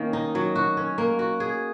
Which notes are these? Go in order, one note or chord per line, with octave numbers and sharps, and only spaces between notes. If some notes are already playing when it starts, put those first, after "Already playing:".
Already playing: D#3 A#3 C#4
D#4
F#3
F#4
C#4
A#3
F#4
G#4